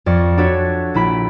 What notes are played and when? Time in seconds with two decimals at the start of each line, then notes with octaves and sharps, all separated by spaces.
0.06 F2 D5 C#6 A#6 C#7
0.37 D4 F#4 A4 C#5 E5
0.94 A#1 E4 B5 D7